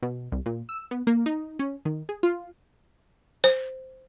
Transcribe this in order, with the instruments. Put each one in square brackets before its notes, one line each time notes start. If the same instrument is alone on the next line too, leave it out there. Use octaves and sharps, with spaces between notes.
[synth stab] B2
C2
A#2
E6
B3
A#3
D#4
C#4
D#3
G#4
F4
[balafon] C5